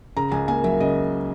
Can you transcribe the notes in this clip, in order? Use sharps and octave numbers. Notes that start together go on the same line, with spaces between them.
C#3 A#5
C#2 G#5
A#3 G#5
F#3 E5
C#3 D#5